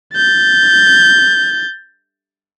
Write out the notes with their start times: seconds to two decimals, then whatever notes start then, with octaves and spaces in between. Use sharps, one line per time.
0.15 G6 A6